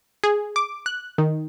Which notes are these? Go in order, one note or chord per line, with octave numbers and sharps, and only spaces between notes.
G#4
D6
F#6
D#3